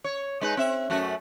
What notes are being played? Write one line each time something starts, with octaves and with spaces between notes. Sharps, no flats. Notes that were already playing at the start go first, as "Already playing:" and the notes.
C#5
G#3 D#4 B4
C4 E5
F#2 A3 F#4